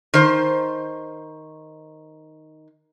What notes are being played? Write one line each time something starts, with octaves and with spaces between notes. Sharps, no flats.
D#3 C5